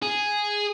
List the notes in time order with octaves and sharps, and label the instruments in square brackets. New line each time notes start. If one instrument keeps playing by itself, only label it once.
[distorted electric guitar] G#4